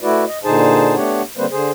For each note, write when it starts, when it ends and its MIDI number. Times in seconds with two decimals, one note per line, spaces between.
0.01 0.24 57
0.01 0.24 64
0.01 0.24 66
0.01 0.24 71
0.01 0.24 74
0.28 0.38 75
0.44 0.95 46
0.44 0.95 50
0.44 0.95 63
0.44 0.95 68
0.44 0.95 72
0.44 0.95 81
0.96 1.22 57
0.96 1.22 59
0.96 1.22 62
0.96 1.22 67
0.96 1.22 73
0.96 1.22 78
1.37 1.46 50
1.37 1.46 55
1.37 1.46 58
1.37 1.46 60
1.37 1.46 71
1.37 1.46 72
1.51 1.71 50
1.51 1.71 68
1.51 1.71 72